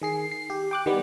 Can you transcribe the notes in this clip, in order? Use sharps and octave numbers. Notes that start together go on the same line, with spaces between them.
D#3 G#4 C7
C7
G4
G5 D6 F#6
D#3 G3 B3